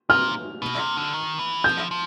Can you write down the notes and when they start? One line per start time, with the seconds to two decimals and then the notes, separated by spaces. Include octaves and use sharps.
0.10 A#2 F6
0.62 B2
0.79 C3
0.96 D3
1.13 D#3
1.39 E3
1.64 F3 G6
1.91 F3